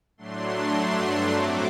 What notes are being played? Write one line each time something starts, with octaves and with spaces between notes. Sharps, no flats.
A2 F#3 A3 D4 C6
G2 F#3 A3 D4
A2 F#3 A3 C4 D6